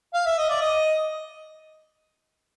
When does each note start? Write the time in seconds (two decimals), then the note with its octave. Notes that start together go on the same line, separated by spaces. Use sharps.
0.14 F5
0.26 E5
0.38 D#5
0.50 D5
0.61 D#5